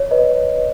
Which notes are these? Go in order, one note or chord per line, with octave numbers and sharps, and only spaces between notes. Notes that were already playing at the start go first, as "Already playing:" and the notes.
Already playing: C#5
B4 D#5